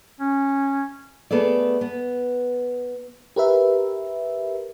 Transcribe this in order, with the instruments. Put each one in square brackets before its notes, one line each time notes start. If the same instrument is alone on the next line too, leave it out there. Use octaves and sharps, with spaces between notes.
[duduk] C#4
[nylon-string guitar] A3 B3 G#4 A4 D5
B3
[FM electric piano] G4 A#4 B4 E5